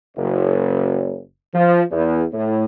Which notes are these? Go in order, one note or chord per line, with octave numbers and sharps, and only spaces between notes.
F#1
F3
E2
A2